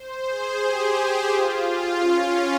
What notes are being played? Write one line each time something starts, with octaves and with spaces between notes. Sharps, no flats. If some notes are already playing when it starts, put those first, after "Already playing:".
Already playing: C5
G#4
G4
F4
C#4